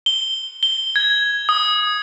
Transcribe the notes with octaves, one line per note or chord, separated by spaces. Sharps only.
G7
G7
G#6
D#6